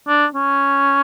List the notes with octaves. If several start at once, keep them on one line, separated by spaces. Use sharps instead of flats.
D4
C#4